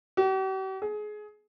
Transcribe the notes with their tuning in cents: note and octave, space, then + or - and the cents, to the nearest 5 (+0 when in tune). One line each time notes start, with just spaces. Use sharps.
G4 -45
G#4 +25